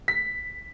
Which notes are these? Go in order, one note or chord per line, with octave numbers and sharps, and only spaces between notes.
B6